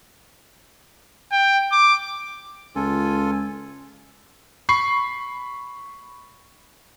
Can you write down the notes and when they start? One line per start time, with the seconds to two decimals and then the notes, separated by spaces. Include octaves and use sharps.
1.32 G5
1.72 D6
2.75 C#2 F4 A4 G#5
4.69 B5 C#6 C7